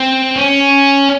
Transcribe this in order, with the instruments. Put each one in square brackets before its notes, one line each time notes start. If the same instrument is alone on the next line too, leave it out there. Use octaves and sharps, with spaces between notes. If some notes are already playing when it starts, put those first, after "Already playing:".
Already playing: [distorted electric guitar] C4
C#4